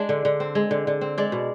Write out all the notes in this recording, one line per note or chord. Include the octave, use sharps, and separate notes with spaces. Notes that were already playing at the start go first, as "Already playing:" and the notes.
Already playing: G#3 D4
D3
D3
C4
G#3
D3
D3
C4
G#3 D5
B2